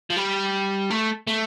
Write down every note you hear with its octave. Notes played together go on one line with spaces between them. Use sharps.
F3
G3
A3
A3